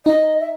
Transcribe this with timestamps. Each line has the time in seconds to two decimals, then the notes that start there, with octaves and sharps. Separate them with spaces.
0.06 D#4 D#5
0.40 E5